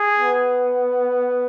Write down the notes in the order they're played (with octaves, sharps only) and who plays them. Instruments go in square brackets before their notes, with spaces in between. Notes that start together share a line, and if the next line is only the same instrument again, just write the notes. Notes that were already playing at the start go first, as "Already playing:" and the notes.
Already playing: [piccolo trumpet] G#4
[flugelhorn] B3